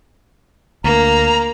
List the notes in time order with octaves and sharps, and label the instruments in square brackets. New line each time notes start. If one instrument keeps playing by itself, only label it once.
[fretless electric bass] D2 [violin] A#3 [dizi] A#5